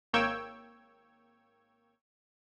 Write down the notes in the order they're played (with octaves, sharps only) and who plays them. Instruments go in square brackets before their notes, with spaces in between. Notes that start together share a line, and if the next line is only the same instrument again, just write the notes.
[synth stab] G#1 A#3 C#5 G5 E6 G#6